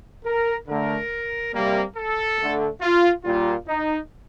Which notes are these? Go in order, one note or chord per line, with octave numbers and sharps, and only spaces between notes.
A#4
D3 A3 A#4
C3 G3 A#3
A4
D3 A3
F4
A#2 G3 A#3 F4
D#4